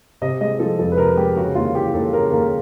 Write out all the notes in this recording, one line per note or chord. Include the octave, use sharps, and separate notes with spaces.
C3 D#5
G#3 D#5
F3 A4
F2 A4
B4
C3 A#4
G#3 G4
C#3 F#4
D#2 F4
E3 G4
D#2 A4
C#3 A#4
D#2 A#4